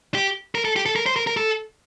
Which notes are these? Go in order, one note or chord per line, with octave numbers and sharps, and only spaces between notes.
G4
A#4
A4
G4
A4
A#4
C5
A#4
A#4
A4